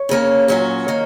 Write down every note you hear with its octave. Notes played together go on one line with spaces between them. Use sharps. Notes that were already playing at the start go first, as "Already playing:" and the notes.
Already playing: C#5
C#3 A#3 C#4
A#2 F#3 C#4 F#4
D#3 A#3 C#5